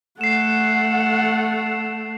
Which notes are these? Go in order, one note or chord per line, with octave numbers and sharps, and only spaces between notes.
A3 F#5 C7 E7